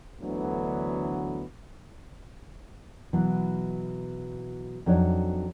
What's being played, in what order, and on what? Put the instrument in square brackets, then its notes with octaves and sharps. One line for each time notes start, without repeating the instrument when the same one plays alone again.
[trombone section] D2 D3 E3 F#3 B3
[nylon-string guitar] B2 E3 F#3
F2 F#3 D4 D#4 C#5